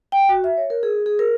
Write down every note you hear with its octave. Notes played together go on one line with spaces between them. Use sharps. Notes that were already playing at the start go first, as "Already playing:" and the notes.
G5
F#4
E5
C#5
A#4
G#4
G#4
A#4